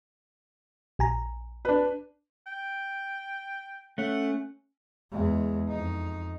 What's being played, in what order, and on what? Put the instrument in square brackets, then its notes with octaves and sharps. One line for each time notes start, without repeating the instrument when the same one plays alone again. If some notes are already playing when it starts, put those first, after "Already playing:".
[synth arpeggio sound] A#1 G#5 A#5
[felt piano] D4 B4
[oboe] G5
[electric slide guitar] A3 [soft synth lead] C#4 [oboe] F#5
[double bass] E2 G#3
F2 D#4